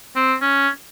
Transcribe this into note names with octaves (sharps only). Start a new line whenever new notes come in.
C4
C#4